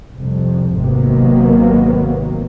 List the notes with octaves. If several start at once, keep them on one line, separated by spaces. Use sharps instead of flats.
C2 F2
G#1 C3 D#3 F#3 A#3 B3